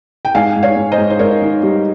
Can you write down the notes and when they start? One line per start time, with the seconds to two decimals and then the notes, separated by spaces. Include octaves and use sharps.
0.25 G5
0.34 G#2 F5 G#5
0.56 G#2
0.63 C#5 F5
0.76 G#2
0.92 C5 D#5
0.98 G#2
1.10 C5
1.19 G#2 A#4 C#5
1.42 D#3
1.63 G3